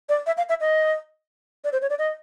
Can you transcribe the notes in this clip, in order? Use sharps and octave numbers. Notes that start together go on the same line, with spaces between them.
D5
E5
F5
E5
D#5
D5
C5
C#5
D5
D#5